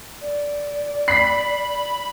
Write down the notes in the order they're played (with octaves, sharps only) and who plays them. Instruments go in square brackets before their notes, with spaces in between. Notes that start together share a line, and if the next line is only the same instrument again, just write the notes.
[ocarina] D5
[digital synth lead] B5 [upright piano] B6 C7